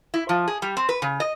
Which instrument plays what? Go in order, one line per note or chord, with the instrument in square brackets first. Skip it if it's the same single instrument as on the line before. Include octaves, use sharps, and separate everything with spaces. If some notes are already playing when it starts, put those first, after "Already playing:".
[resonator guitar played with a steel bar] E4
F3
G#4
G3
C4
B4
C#3
D#5